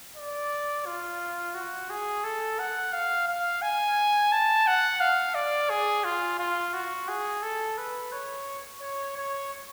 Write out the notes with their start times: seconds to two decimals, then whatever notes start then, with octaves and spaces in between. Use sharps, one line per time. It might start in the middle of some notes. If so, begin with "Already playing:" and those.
0.16 D5
0.86 F4
1.55 F#4
1.90 G#4
2.24 A4
2.59 F#5
2.93 F5
3.28 F5
3.62 G#5
4.32 A5
4.67 F#5
5.00 F5
5.35 D5
5.70 G#4
6.04 F4
6.39 F4
6.74 F#4
7.08 G#4
7.43 A4
7.78 B4
8.12 C#5
8.81 C#5
9.16 C#5